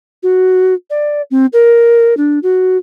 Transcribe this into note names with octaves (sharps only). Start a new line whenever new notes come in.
F#4
D5
C4
A#4
D4
F#4